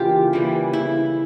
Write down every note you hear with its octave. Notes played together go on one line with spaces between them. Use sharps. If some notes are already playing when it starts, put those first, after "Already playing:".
Already playing: C#3 E3 A#3 D4 F4 G4
C#3 E3 G3 A#3 E4
E4